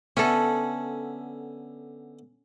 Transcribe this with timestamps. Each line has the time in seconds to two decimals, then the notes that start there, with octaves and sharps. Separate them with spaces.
0.17 D3 B3 C#4 A4 E5